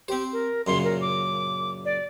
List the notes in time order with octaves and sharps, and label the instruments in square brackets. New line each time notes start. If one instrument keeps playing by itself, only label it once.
[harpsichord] C4 C5 [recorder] G4
[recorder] A#4
[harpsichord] F#2 A#2 C#3 [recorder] C6
[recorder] A#4
D6
D5